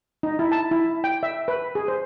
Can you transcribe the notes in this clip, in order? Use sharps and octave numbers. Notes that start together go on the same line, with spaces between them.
D#4
E4
A5
E4
G5
E5
B4
G#4
C5